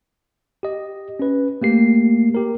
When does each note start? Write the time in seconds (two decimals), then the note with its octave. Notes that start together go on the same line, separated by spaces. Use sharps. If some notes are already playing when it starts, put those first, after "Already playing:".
0.63 G4 D#5
1.19 C#4 B4
1.62 A3 A#3 G4 C7
2.35 A#3 G4 A#4